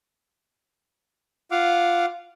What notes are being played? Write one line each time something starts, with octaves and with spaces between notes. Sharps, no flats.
F4 F5 F#5 D6